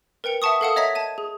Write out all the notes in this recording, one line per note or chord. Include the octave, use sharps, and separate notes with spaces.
A#4 B4 G5 C#7 F7
E5 F#5 A5 C#6 D#6
A4 A#4 F5 F#5 A5 D#6
C#5 D#5 E5 A#5 G#6 B6
A5 G#6 D#7
G#4